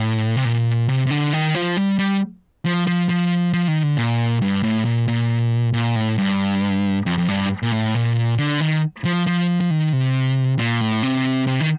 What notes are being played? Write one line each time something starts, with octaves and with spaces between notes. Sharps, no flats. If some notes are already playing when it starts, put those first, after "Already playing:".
Already playing: A2
C3
A#2
C3
C3
D3
D#3
F3
G3
G3
F3
F3
F3
F3
D#3
D3
A#2
G2
A2
A#2
A#2
A#2
A2
G2
F2
F2
G2
A#2
A2
A#2
D3
D#3
F3
F3
F3
D#3
C3
A#2
A2
C3
C3
D#3